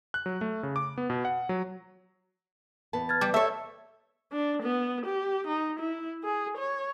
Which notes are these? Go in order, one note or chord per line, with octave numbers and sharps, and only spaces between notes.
F#6
F#3
A3
C#3
D6
B3
B2
F#5
F#3
E2 B4 A5
F6 G#6 A6
G3 D6
A4 C#5 E5 E6
D4
B3
G4
D#4
E4
G#4
C#5